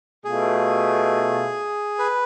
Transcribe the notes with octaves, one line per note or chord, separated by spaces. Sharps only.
B2 A3 F4 G#4
B4